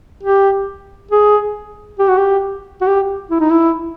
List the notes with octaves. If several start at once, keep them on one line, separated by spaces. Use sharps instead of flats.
G4
G#4
G4
F#4
G4
F#4
G4
E4
D#4
E4